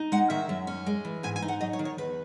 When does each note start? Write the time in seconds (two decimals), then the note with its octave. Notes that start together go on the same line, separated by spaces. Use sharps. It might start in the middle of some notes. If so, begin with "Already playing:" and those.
Already playing: D#4
0.12 G#3 F#5
0.30 D#3 E5
0.49 F#2
0.67 C#4
0.86 G#3
1.05 E3
1.23 G#2 G#5
1.36 G#5
1.42 D#4
1.48 F#5
1.61 F#3 D#5
1.73 C#5
1.79 D#3
1.85 C#5
1.98 E2 B4